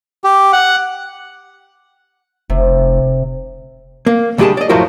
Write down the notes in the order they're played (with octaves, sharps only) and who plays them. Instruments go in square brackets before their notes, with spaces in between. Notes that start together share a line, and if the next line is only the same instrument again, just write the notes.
[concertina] G4
F#5
[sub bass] F1 [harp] C3
[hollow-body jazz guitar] A#3
D2 G3 G#3 G4 G#4 A5
D5 D#5
F#2 A2 F3 E4 F#4 A#4